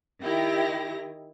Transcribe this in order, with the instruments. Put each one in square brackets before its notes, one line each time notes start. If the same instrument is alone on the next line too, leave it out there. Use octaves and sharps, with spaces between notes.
[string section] D#3 E4 G4 A#6